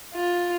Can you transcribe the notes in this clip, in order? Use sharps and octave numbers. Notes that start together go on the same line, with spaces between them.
F4